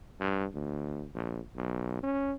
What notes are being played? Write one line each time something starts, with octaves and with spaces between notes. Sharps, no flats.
G2
D2
A#1
B1
C#4